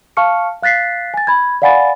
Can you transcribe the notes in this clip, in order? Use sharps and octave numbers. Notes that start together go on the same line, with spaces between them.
F5 A5 C#6 F6 C#7
F5 F#6 A6 B6 C7
G#5 A6
B5 G#6
D5 F5 F#5 G#5 B5 A6